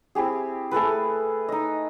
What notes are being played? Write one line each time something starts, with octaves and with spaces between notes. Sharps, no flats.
C4 E4 G4 G#4
A3 G#4 A4 B4
D#4 D#5